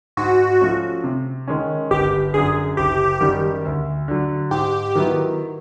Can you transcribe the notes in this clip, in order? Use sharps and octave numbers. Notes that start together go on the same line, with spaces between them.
G#2 F#4
F3 A3 C#4
C3
D#3 G#3 C#4
G1 G4
F#2 D3 G#4
F#1 G4
F#2 D#3 G3
D2
D3 F#3
G#2 G4
D#3 F#3 B3 E4